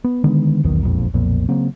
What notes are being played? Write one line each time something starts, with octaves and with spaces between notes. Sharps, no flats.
B3
D3 D#3 G#3 B3
F#1 B1 E2 D#3
E1 A#1 F2
B1 F2 A#2
C#3 F#3 A#3 C4